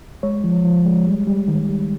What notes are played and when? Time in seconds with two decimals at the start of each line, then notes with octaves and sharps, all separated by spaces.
0.23 G#3 C#5
0.44 F3
0.65 F3
0.85 G#3
1.06 G3
1.27 G3
1.48 D#3
1.69 G3